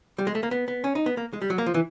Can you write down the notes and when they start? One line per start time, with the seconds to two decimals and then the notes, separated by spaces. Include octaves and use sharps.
0.18 G3
0.27 G#3
0.35 A3
0.43 A#3
0.51 B3
0.68 B3
0.84 C#4
0.95 D#4
1.06 B3
1.17 A#3
1.33 G#3
1.42 G3
1.50 F#3
1.58 A#3
1.66 F3
1.74 E3